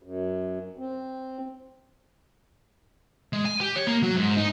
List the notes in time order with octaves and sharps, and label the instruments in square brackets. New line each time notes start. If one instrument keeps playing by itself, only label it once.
[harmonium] F#2
C4
[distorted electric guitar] G#3
G#5
G4
C#5
A#3
F#3
G#2
D#4